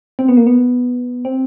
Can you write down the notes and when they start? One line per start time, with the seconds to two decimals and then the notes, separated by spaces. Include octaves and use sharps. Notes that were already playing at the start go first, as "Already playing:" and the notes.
0.19 C4
0.28 B3
0.37 A#3
0.47 B3
1.25 C4